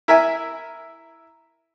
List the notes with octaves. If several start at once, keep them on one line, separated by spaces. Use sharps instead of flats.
E4 A#4 E5 G#5